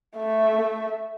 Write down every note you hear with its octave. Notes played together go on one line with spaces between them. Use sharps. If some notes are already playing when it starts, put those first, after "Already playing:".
A3 E5